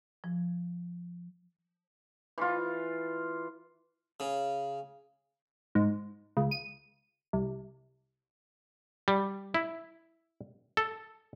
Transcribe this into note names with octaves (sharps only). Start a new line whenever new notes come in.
F3
E3 F4
C#3
G#2
C#2
D#7
C2
G3
E4
A4